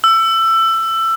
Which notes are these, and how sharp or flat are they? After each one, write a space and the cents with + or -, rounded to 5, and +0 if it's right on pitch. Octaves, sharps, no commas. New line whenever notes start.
E6 +20